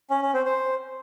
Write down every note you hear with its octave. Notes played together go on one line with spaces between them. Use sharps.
C#4
C#4
C4
C5